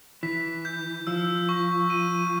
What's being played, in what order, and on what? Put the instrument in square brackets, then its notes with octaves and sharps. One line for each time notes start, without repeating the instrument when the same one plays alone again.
[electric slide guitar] E3 [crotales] B6
[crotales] G6
[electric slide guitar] F3 [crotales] E6
[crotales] C#6
D#7